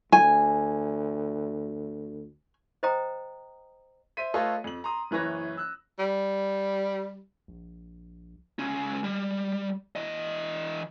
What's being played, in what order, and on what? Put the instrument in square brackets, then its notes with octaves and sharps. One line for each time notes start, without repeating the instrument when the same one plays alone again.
[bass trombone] D2 [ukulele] G#5
[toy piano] C5 D#5 G5 A#5 D#6
[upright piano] C5 E5 B6 D#7
A3 F4 A4 B4 C#5 D#5
F2 F#7
A#5 C6 D#6
F#1 E3 B4 C#5 A#6
E6 F#6
[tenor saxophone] G3
[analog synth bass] A#1
[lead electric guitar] C#2 C#4
G3
E3 D#5